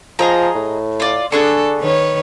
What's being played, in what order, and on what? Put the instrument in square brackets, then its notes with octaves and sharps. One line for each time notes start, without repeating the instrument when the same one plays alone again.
[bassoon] F3 [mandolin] G#4 D#5 A#5
[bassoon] A2
[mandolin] F4 D5
[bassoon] D3 [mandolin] D4 G#4 C#6 [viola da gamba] A4
[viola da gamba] D#3 B4 C#5